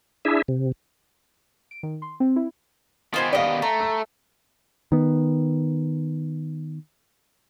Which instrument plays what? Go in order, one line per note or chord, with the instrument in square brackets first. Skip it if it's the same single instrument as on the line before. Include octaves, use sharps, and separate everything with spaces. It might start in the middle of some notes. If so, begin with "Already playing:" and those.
[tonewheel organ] D4 E4 G#4 E5
C3
[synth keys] D7
D#3
C6
C4
E4
[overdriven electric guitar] D#3 B3 [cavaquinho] F4 C5 G#5
[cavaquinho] G4 D#5 [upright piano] D5 F5
[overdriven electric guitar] A3 [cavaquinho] A#5
[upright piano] E6
[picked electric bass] D#3 B3